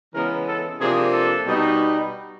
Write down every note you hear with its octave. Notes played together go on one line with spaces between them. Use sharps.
C#3 E3 G#3 B3 A#4
A4
C3 F3 A#3 D4 G#4
A4
B2 G3 B3 D#4